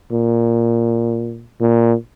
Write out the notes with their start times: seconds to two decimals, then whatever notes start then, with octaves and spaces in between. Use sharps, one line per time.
0.12 A#2
1.61 A#2